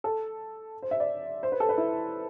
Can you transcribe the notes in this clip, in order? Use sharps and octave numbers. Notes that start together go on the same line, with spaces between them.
A4
C5
E5
D5
C5
B4
A4
B4
E4